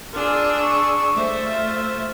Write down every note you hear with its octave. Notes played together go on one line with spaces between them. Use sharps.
D4 F4 G#4 E6
C#6
A3 C5 E5
F4